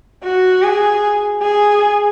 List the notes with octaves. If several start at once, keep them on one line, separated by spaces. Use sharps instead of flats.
F#4
G#4
G#4